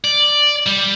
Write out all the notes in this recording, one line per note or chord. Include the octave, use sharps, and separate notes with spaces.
D5
G3